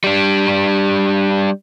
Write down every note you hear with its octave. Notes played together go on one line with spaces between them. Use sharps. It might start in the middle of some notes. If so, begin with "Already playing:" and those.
G3 D4